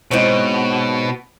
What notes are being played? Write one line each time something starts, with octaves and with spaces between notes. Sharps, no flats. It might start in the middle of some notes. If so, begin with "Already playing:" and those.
G#2 B2 C4 C#5